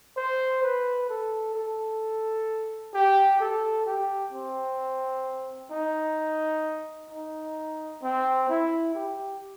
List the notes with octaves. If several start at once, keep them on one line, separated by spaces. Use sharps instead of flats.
C5
B4
A4
A4
G4
A4
G4
C4
D#4
D#4
C4
E4
G4